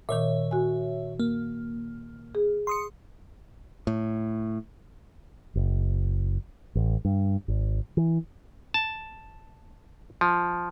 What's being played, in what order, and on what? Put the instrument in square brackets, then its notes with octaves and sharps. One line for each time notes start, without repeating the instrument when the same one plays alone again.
[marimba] A#2 D#3 [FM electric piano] C#5 E5
[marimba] F#4 G#5
[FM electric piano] A#3
[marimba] G#4
[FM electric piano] C6 D#6 C#7
[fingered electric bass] A2
F#1
A1
G2
G#1
E3
[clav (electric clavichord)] A5
F3